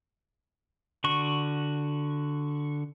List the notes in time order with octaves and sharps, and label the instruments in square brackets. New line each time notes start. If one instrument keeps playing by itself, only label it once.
[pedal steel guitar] D3 F#4 C#6